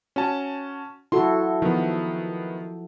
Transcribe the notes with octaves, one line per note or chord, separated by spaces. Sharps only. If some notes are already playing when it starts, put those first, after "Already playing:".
C#4 F#4 A5
E4 F#4 A4 C6
D#3 F3 B3